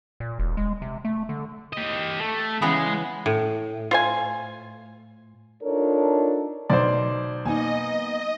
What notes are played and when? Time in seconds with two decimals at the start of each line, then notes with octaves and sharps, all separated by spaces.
0.20 A#2
0.39 E1
0.57 G#3
0.82 C3
1.05 A3
1.29 D3
1.73 G4 D#5
2.20 A3
2.62 C#3 E3 G#3 B3
3.26 A2
3.91 F4 C5 G#5
5.62 D4 D#4 F4 A4 A#4 C#5
6.70 B1 C5 D5
7.45 A#3 B3 D#4 D#5 G#5